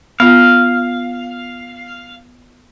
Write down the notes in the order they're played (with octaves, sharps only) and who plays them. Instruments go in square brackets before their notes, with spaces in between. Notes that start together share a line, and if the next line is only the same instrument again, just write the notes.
[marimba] B3 F4 [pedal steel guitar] F5